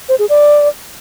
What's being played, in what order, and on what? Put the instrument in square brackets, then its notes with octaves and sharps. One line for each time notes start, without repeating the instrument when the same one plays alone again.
[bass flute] C5
G#4
D5